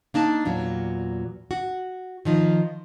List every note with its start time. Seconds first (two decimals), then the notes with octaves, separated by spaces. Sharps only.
0.14 A#3 D4 D#4 A5
0.45 E2 A#2 F#3
1.51 F#4
2.25 D#3 F3 D#4